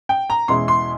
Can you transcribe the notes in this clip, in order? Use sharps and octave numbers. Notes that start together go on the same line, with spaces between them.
G5
A#5
E2 B2 G#3 C#4 E4 C6
C6